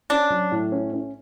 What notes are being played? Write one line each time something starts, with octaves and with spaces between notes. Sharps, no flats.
C#4 D4
F#3
A2
C#4
C#4